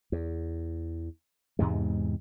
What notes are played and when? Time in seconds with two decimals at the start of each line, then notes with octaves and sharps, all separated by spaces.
0.12 E2
1.59 E2 G#2 C3 G#3